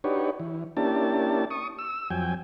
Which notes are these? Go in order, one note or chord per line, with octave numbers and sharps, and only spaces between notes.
D4 D#4 F#4 G4 B4 C#5
E3
A#3 C#4 D4 E4 G4 A5
C#6 D#6
E6
F2 F#3 G5 G#5